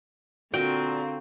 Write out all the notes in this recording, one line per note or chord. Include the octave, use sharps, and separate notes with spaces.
A#2 D3 C4 F#4 G5